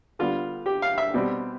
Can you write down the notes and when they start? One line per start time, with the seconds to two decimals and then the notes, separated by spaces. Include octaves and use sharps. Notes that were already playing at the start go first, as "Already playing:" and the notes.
0.19 D3 G3 B3 F4
0.66 G4
0.82 F5
0.98 E5
1.14 B2 G3 C4